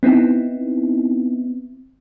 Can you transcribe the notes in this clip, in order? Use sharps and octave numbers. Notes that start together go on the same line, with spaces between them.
B3 C4 D#4 E4